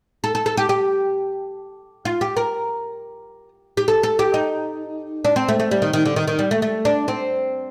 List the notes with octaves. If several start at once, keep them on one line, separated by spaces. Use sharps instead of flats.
A4
A4
A4
G4
G4
F4
G4
A#4
G4
A4
A4
G4
D#4
D4
C4
A3
A3
G3
D#3
D#3
D3
D#3
D#3
G3
A3
A3
D4
C4